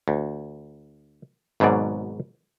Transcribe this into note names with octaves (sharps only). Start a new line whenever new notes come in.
D2
G#1 G#2 B2 F#3 D5